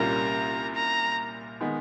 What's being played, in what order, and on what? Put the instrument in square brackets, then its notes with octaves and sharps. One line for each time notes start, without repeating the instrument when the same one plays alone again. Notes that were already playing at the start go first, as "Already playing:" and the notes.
Already playing: [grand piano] C2 A#2 G3 A#3 C#4 [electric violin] A#5
[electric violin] A#5
[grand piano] D#3 G#3 B3